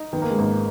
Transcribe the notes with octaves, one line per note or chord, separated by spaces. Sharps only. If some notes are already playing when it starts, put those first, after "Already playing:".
Already playing: D#4
D#3 B3
A#3
G#3
G#1 A#3